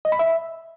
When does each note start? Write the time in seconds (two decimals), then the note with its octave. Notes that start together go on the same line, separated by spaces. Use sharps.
0.05 D#5
0.12 B5
0.19 E5